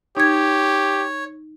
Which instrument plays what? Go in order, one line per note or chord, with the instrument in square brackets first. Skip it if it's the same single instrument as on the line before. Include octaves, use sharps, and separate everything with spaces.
[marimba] D#4 G#6 [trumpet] G4 [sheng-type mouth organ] C#5